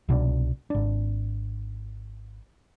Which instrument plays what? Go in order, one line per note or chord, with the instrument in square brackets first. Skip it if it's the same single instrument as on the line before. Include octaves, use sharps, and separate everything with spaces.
[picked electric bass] C2 B2 C#4 D4
G#1 D4